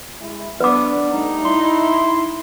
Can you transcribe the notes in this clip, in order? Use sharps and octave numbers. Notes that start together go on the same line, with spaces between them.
G#3 E4
B3 D4 B4 D6
G3 A3 D#4
E4 C6